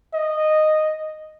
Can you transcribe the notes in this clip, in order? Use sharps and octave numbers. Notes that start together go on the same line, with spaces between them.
D#5